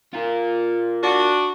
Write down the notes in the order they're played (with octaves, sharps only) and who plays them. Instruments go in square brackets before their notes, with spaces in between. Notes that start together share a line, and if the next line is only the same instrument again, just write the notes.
[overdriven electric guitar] F4 A#4
[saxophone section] D4 F#4